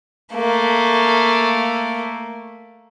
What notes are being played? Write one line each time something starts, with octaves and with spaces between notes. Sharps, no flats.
A3 A#3